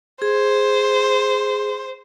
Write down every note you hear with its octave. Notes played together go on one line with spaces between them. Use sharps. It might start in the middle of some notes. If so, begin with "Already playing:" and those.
G#4 C5